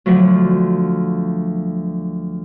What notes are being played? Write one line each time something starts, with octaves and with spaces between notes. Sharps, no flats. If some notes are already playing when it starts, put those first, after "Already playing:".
D2 F3 F#3